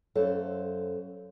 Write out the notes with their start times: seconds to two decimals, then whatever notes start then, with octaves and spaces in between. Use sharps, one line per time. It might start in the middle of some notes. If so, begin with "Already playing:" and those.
0.15 F#2 A4 C5 F5